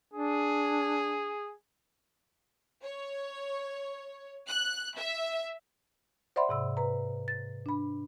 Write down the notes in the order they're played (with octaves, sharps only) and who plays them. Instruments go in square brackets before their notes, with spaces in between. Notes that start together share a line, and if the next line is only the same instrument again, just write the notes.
[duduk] D4 [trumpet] G#4
[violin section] C#5
F#6
E5
[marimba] C5 D5 E5 F#5 B5 C6
G#2 C3 E6
B4 A#5
A6
D4 B5